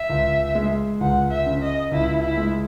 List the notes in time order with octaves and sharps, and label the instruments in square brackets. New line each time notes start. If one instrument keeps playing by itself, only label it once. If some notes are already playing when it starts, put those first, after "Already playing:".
Already playing: [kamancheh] E5
[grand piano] C#2
G#3
[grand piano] C#2 [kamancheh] F#5
[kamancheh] E5
[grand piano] C#3
[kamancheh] D#5
[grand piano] C#2 [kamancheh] E4
[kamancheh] E4
[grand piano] G#3